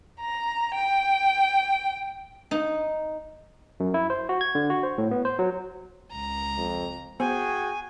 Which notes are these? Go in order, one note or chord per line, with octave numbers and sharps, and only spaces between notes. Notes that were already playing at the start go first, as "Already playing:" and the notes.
A#5
G5
D#4
F#2
E4
C5
F#4
G#6
D3
F#4
C5
A2
B3
C5
F#3
C#2 A#5
F2
B3 F#4 G#4 C5 G5 G#5